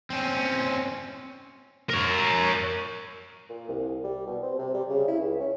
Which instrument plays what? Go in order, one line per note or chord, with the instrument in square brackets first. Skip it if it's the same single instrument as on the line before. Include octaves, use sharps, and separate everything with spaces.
[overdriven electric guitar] C4 C#4
[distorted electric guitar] A#4 C#5
[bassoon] A#2
C2
G3
B2
C4
C3
G3
C#3
E4
C#2
C#4